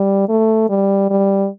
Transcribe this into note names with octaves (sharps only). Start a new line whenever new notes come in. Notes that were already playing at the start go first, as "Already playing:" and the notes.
Already playing: G3
A3
G3
G3